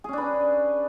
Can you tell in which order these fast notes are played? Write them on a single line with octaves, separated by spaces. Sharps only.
G#4 C#4 D4 B4